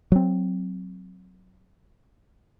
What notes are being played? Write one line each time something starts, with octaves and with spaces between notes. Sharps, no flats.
F#3 C4